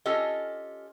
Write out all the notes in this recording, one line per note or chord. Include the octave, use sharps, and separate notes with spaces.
C#4 F4 G4 A4 D#5